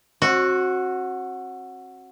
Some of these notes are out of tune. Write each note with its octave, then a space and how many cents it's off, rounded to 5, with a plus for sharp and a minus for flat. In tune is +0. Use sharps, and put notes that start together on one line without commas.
C4 +45 F#4 -5